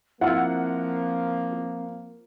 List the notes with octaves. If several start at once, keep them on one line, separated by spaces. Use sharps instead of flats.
F3 A#3 C4 E4 F4 F#5